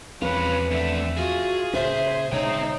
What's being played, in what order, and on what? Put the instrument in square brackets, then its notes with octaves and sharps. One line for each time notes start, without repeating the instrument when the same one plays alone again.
[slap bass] E2 F3 C4 [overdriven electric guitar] C#4 F4 [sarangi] B4
[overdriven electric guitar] A3 D4 [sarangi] E5
[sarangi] F4 [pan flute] F#4 [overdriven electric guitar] G#4
[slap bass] A#2 C#3 C#4 [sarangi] C5 [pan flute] E5
[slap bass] B2 D3 G#3 [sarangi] D#4 [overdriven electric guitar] C5 G5 [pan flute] C#5